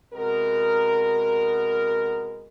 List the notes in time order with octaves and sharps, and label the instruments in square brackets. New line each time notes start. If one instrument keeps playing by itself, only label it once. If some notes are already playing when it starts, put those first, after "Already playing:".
[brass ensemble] C3 G#3 B3 F#4 A#4